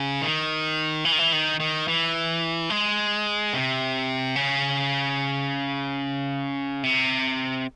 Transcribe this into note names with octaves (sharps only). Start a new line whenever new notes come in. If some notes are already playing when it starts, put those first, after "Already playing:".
Already playing: C#3
D#3
E3
D#3
E3
D#3
D#3
E3
G#3
C3
C#3
C3